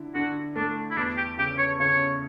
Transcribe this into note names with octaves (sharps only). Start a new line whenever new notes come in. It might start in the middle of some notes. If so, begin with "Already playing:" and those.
Already playing: D3 E4
D3 F#4
A3 D4
E4
E2 D4
G4
C#3 G4
C#5
C#3 C#5